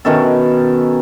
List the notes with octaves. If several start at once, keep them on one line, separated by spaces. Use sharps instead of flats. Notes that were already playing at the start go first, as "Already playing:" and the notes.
B2 D#3 C#4 A4